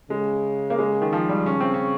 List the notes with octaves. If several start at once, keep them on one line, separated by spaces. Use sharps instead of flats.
C#3 G#3
A#3
G#3
D#3
F3
G3
C#3 C#4
C4
C#4